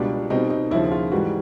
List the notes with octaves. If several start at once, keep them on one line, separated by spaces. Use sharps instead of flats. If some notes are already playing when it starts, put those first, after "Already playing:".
Already playing: C#2 B2 G3 D4
B2 G3 C4 D#4
D#4
D#2 C#3 F3 E4
F4
G#2 E3 G3 F#4